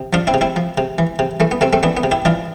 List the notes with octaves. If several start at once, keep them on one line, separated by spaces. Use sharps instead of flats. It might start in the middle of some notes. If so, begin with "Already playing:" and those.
Already playing: C3
F3 D4 F4
C4 E4
C3
C4 E4
F3
C3
E3
C3
E3 A3
B3
C3 A3 C4
A3 C4
E3 B3 D4
B3
C3
E4 G4
E3 D4 F4